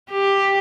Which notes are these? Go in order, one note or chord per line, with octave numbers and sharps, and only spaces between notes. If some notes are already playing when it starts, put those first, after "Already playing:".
G4